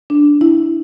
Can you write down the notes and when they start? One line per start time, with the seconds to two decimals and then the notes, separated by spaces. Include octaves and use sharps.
0.10 D4
0.41 E4